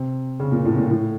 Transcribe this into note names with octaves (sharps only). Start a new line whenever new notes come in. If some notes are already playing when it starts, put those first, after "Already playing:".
Already playing: C3
C#3
A#2
A2
A#2
A2